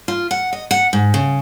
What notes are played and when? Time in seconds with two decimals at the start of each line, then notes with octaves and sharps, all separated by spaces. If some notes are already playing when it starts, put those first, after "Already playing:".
0.08 F4
0.31 F#5
0.53 D#5
0.71 F#5
0.93 G#2
1.14 C#3